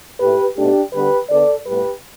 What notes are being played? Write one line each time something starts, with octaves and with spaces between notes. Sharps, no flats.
A2 A3 G4 B4
B2 A3 D4 G4
D3 G3 B3 G4 B4
D3 B3 A4 D5
A2 G3 B3 G4 B4